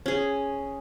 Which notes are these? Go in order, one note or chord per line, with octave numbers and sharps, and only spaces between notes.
C#4 G#4